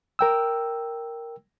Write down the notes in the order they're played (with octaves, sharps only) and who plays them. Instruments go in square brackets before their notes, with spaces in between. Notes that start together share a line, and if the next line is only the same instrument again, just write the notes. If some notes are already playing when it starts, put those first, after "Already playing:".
[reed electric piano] A#4 G5 E6